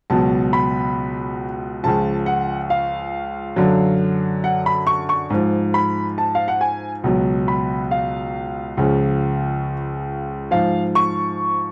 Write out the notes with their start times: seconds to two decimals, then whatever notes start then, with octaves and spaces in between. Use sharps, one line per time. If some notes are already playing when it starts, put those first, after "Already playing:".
0.10 C#2 B2 F#3 A5
0.53 B5
1.83 C#2 C#3 F3 A5
2.26 F#5
2.70 F5
3.56 F#2 D3 F#3
4.44 F#5
4.66 B5
4.87 C#6
5.09 C#6
5.30 G#2 F3
5.74 B5
6.18 A5
6.35 F5
6.48 F#5
6.61 G#5
7.04 C#2 B2 F#3
7.48 B5
7.91 F5
8.77 C#2 C#3 F3
10.51 G#2 F3 F5
10.95 C#6